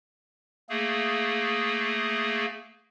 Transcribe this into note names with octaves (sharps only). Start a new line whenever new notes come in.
A3 A#3 G#4